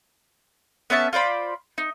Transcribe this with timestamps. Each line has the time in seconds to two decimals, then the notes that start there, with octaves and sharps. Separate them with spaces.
0.90 B3 C#4 E5 A5
1.13 F4 C5 D5 B5
1.78 D#4